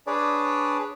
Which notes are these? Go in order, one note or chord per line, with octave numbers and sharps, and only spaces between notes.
D4 G#4 B4 C#5 D5